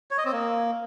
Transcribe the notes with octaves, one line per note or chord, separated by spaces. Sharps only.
C#5
D#5
C4
A#3